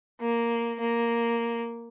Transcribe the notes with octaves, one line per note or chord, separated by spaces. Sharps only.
A#3
A#3